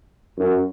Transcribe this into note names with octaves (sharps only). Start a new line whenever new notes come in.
F#2